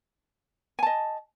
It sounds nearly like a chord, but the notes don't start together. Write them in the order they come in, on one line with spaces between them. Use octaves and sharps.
G#5 A5 D#5